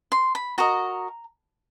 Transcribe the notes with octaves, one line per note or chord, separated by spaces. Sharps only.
C6
B5
F#4 A#4 D#5 A#5